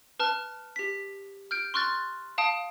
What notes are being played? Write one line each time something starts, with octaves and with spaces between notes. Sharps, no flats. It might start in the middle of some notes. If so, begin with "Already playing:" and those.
B4 A5 F6
G4 B6
F6 G6 D7
C6 C#6 F6 F#6 A6
F5 A5 D#6 D7